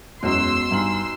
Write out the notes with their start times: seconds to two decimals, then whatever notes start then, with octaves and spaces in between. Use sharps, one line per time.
0.23 E1 F#2 B2 F#3 C#4 C6 E6
0.71 G2 D#4 G#5 A#5 F6 F#7